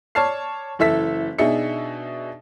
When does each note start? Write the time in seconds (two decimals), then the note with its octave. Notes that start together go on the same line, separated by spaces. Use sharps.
0.15 C#5 D5 A5 F6 C7
0.79 F#1 E3 A4 E5 E6 B6
1.38 B2 D4 D#4 G#4 E5 C#7